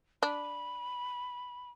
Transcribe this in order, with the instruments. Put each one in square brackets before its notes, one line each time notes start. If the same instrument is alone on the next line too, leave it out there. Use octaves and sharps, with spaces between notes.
[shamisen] D4 [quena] B5